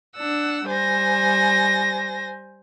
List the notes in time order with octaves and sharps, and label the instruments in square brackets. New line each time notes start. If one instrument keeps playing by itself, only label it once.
[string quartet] D4 F#5 E6
G3 C5 G#5 A#6